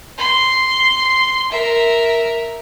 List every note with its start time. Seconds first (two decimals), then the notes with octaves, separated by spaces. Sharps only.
0.18 C6
1.51 A#4 E5